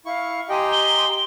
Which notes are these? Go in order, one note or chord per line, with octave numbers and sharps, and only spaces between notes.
E4 F5 C#6
G4 D#5 G5 G#5 A#5 C6
G7